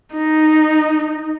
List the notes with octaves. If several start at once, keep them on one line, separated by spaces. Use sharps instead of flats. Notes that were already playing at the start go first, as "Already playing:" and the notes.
D#4